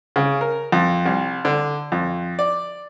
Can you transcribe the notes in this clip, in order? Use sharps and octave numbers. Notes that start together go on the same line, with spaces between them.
C#3
A#4
F2
C2
D3
F2
D5